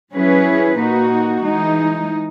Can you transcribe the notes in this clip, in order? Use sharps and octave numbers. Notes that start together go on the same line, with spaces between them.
F#3 C#4 E4 G#4 B4
A#2 A#3 D#4 F#4
E3 G#3 D#4